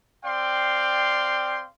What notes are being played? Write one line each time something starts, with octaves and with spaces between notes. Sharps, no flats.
C4 D5 F5 G5 C6